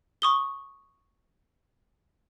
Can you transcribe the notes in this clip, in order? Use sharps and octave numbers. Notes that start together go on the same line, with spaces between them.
C#6 D#6 G7